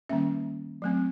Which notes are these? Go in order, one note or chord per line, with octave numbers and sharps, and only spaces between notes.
D#3 G3 A#3 C#4 E5
F#3 A3 C4